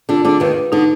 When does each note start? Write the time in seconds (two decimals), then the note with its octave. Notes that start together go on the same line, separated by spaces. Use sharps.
0.09 D3 D4 F4
0.24 D3 D4 G#4
0.40 D#2 D#3 B4
0.57 B4
0.72 D3 D#4